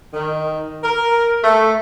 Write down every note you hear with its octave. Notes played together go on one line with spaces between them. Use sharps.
D#3
A#4
A3